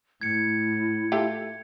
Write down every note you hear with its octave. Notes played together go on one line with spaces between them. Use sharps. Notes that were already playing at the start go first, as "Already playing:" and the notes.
A2 E4 G#6 C#7
A3 F4 G4